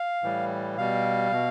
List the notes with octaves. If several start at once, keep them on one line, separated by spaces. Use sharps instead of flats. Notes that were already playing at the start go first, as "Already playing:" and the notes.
Already playing: F5
A2 E3 G3
B2 G3 F5
B2